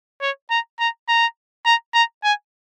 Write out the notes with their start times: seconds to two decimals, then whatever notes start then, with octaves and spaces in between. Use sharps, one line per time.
0.22 C#5
0.50 A#5
0.80 A#5
1.09 A#5
1.66 A#5
1.94 A#5
2.24 G#5